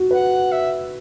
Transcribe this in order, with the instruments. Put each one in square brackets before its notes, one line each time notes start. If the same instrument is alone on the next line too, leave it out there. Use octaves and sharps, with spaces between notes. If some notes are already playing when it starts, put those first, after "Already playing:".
Already playing: [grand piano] F#4
[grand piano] B4 [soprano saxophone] F#5
[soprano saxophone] E5